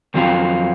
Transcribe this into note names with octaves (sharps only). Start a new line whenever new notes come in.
F2 D#3 F#3 C4 F4